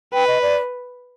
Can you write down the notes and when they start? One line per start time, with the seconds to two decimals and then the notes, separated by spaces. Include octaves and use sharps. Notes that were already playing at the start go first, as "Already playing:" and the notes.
0.13 B4 G5
0.27 D#5
0.42 D5